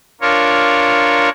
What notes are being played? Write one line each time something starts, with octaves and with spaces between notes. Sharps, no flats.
D4 F4 A#4 C#5